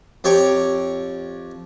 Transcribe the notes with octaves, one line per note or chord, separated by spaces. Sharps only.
F2 G4 C#5 A#5 C#6 D6